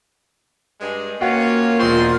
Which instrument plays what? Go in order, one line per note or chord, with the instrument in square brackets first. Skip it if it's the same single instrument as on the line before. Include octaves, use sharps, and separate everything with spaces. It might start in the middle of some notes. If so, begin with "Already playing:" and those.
[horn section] G2 G#3
[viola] A#3 [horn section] C#4 F4 C#5 [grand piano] F#4 F#5 G5
[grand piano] E1 C#6 [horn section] G#3 C4 C6 [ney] F4